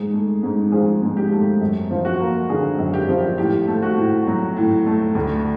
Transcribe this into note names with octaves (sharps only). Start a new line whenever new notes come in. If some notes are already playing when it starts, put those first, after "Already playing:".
Already playing: G#2 G#4
A3
G#2
F3 G#4
G#2
G4
A3
F#2
F3
F#4
A#3
D3 G#4
F#2
G4
F3
A2 G4
A3
F#4
A2
F#3
A2
A3
D2